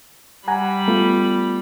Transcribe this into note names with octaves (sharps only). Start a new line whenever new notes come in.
G3 F#5 G#5 A#5 B5
A3 B3 F4